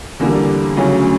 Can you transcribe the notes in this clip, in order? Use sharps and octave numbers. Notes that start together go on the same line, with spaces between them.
E2 D3 G3 A#3
D2 C#3 F#3 C#4